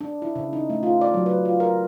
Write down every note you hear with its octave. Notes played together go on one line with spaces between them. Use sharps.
D4
E4
C#3
D#4
A3
F4
D5
F#3
B4
F4
A#4